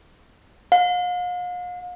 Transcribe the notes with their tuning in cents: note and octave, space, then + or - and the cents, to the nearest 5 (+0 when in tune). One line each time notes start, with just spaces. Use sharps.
F5 +40